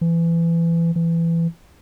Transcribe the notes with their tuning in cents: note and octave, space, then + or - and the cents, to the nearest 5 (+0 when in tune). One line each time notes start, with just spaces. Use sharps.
E3 +25
E3 +20